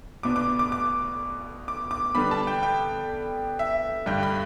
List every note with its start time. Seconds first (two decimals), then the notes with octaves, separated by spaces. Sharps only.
0.23 B2 B3 D4 D6
0.36 D6
0.59 D6
0.72 D6
1.68 D6
1.91 D6
2.15 D3 G3 B3 D4 B5
2.31 A5
2.47 G5
2.63 G5
3.59 E5
4.06 G2 D3 G3 G5
4.23 B5